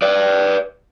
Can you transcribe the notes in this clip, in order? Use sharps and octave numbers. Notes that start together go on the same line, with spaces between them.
B4 D5